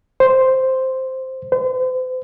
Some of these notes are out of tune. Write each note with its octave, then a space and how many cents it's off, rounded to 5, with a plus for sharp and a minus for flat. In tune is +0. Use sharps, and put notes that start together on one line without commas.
C5 +0
C5 -40